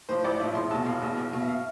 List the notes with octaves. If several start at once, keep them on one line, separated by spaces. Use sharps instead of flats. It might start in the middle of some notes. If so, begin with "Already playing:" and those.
A2 F3 C5
A1 D5
A2 F3 E5
E1 C6
E2 B2 A5
E1 F5
E2 B2
B1
B2
E5
F5